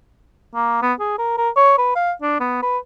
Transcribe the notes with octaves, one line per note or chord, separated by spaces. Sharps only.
A#3
B3
G#4
A#4
A#4
C#5
B4
F5
D4
B3
B4